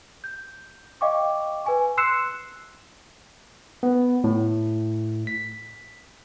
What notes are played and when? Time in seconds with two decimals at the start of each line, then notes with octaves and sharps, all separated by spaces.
0.24 G6
1.01 D#5 F5 G5 C#6 D6
1.64 B4 G#5 C#6
1.97 C6 E6 F#6 C7 C#7 E7
3.83 B3
4.24 A2
5.27 B6